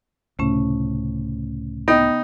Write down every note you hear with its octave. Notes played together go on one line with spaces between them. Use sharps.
C#2 A2 C3 A3 C#4
B3 D#4 G5